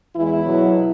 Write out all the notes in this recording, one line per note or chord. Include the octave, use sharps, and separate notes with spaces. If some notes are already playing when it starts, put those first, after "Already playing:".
E2 E3 G#3 E4
B2 F#3